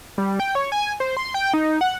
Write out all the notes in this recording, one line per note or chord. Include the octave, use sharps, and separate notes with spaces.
G3
G5
C#5
G#5
C5
C6
G5
D#4
F#5